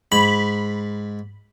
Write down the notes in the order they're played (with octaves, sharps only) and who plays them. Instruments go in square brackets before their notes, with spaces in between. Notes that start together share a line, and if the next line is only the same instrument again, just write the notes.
[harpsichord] G#2 [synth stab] B5